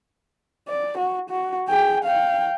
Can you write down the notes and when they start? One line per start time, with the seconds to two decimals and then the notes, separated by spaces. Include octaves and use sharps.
0.69 D5
0.98 F#4
1.30 F#4
1.68 G#4 G5
2.04 F5 G5